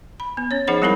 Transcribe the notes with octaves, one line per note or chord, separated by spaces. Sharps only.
B5
B3
C#4 C#5
F3 D#4 G#4 C5 F#5 B5
G3 G#3 C4 E4 A#4 B5